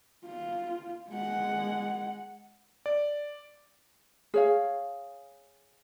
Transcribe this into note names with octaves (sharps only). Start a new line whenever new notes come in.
F4
G#3 F#5
D5
G#4 C#5 F5